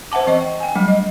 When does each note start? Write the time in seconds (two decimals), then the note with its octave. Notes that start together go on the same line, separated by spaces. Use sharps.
0.12 C5 E5 F#5 A5 D6
0.27 E3 C4 D#5 A5 C#6
0.41 G5
0.60 G5 G#5
0.75 F#3 G3 A3 D4
0.88 D#5